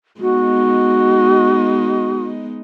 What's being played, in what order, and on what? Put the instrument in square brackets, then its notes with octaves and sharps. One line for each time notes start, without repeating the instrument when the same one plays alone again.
[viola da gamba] G#3 B3 D#4 [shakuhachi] F#4